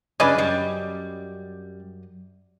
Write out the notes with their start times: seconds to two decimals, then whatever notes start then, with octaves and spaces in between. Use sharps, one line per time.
0.20 F#2 C#3 C#4 D4 B4 D5 D#5
0.38 G3